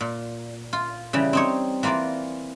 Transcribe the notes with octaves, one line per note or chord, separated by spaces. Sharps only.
A#2
F4
C#3 E3 G3
C4 D#4 C#5
E3 A#3 F4 A#4 D5